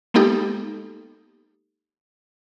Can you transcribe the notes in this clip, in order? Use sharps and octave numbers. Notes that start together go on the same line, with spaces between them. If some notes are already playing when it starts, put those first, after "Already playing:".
G#3 A#3 B3 D#4 G4 A4